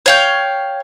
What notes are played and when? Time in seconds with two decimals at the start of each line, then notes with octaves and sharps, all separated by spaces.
0.06 C#5 F5 G5